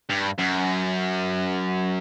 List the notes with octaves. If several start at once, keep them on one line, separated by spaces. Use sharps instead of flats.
G2
F#2